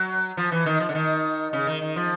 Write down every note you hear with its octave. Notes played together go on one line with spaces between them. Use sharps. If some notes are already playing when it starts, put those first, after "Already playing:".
Already playing: F#3
F3
E3
D#3
F3
D3
D#3
C#3
D#3
D#3
F3